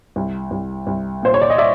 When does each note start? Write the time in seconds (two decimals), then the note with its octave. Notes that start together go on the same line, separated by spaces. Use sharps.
0.16 C2
0.51 C2
0.87 C2
1.23 A#2 C5
1.34 C#5
1.41 D5
1.50 D#5
1.58 D5 E5